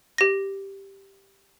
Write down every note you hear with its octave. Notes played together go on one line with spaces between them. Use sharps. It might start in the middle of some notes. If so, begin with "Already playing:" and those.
G4 A#6